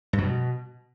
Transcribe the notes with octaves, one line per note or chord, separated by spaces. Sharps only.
G2
F#3
B2